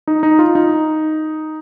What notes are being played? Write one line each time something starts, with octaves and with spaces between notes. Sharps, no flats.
D#4
D#4
F4
D#4